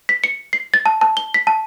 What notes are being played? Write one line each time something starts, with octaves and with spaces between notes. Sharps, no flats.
B6
C#7
C7
A6
A5
A5
G7
B6
A5